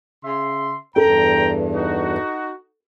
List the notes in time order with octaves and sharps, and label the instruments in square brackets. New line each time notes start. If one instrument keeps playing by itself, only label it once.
[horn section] C#3 E5 C6
[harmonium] E2 G2 [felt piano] A4 [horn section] G5 A#5
[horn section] D#4 F#4